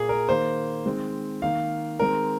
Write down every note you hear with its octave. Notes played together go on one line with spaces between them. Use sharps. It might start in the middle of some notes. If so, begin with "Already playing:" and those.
Already playing: A#2 A#3 G#4
A#4
D#3 A#3 C5
D#3 G#3 C4
D#3 A#3 F5
D#3 G#3 C4 A#4